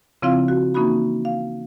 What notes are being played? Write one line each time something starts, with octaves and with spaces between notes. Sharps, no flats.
C#3 F3 C4 E4 F4 F5
F#4
E3 A#3 C#4 D#4 F#4 B5
F5